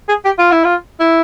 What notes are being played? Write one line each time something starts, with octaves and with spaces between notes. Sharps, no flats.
G#4
G4
F4
E4
F4
E4